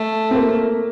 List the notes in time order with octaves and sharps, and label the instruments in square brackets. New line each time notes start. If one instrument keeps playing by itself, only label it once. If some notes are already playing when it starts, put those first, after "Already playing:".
Already playing: [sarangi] A3
[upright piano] C4
A#3